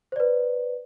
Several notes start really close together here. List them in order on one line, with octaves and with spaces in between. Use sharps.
C5 D5 B4